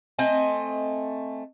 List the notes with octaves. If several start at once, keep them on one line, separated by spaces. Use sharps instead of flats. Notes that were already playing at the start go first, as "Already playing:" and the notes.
A3 C4 D#5 G#5